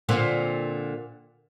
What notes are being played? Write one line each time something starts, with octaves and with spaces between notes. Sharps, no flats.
A#2 D3 C4